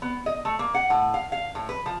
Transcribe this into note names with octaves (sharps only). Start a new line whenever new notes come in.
B3
D#5
A3
A#3
F#5
A2
F5
F5
A2
B4
F3